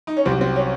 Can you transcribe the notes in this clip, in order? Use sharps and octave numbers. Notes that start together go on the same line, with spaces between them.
D#4
C#4
C2 C3 F#3 C4
C4
C#4